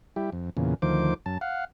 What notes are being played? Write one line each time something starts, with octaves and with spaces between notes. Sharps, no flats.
G3 E4 G4
F2
E2 A#2 C#3
D2 D#3 F3 C5 D6
F#2 A5
F5 F#5